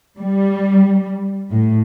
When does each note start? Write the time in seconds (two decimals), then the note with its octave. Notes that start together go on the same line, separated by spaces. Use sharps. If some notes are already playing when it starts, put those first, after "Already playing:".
0.19 G3
1.51 A2